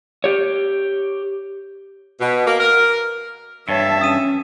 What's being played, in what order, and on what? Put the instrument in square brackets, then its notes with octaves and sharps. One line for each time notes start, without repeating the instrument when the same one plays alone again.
[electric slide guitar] G4 C#5
[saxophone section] B2
A#3
A#4
[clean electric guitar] G2 [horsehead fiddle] C#5 A5 [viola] E5
[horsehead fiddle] C#4 [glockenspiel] D#6 D#7 E7